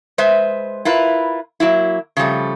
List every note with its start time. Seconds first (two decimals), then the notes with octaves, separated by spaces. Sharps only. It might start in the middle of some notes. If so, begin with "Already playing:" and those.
0.18 G#3 B4 C5 E5
0.85 E4 F4 A#4 B4
1.60 F#3 A#3 E4
2.17 C#3 F3 G3 A3